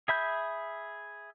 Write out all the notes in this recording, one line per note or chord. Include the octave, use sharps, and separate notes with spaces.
G#4 E5 B5 G6